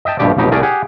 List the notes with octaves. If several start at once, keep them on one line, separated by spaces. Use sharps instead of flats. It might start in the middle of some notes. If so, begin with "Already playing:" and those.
D#5 E5 G5 A5
A#1 G2 B2 G4 D5
A1 F2 B2 D#4 G4
C2 A3 G#4 A#4 D5
G4 G#4 F#5